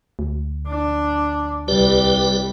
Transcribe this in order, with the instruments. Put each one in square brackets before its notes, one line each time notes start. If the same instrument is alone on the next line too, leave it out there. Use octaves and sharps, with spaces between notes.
[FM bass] D2
[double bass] D4
[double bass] C2 G3 [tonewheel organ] G4 B4 D5